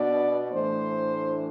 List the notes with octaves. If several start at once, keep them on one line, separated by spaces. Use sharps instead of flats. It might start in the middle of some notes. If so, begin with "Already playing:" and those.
Already playing: B2 B3 D4 D5
A2 E3 A3 D4 C5